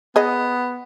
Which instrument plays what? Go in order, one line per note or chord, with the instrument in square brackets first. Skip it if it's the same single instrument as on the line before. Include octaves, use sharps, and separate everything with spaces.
[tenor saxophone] B3 [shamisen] G#4 D#5